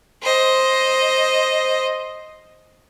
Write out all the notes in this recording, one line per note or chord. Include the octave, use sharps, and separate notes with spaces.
C5 D#5